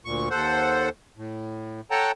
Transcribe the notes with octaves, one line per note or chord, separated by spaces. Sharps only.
D2 A#2 C#6
D#2 A4 C5 F#5
A2
A4 C#5 F#5 G5 A5 A#5